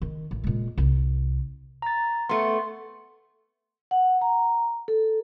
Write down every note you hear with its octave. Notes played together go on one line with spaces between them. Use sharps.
D#3
A1
A#2 G#3
C2
A#5 A6
A3 B3 C6
F#5
A#5
A4